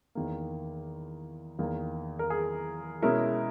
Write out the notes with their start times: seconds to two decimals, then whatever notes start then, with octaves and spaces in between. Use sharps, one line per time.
0.15 E2 D#3 A#3
1.59 E2 D#3 A#3
2.19 A#4
2.30 G#4
3.02 B2 G#3 C#4 E4 A#4